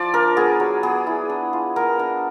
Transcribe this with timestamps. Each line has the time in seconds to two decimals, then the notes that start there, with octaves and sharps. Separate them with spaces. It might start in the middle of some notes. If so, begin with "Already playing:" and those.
Already playing: F3 D5
0.14 D4 A#4
0.37 B3 G#4
0.60 F#3
0.83 B3 G#4
1.07 E4
1.30 D4
1.53 F4
1.76 B3 A#4
1.99 D4